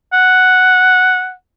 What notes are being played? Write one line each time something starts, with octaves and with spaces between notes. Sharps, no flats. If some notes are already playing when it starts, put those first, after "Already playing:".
F#5